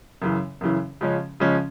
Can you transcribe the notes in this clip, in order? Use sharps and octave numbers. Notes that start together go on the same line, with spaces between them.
F#2 C#3 E3
F#2 C#3 E3
C#3 F3 G#3 C#4
C#3 F3 G#3 C#4